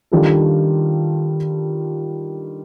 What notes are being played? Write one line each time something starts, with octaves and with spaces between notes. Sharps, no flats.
D#3 G3 D4 F4 A4